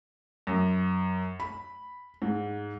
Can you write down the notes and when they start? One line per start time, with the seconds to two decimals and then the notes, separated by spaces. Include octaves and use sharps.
0.47 F#2
1.40 B5
2.22 G#2